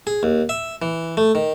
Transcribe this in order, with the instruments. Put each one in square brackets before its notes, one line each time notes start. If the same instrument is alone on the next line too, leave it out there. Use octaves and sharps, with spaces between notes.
[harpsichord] G#4
D#2
E5
E3
A3
D#3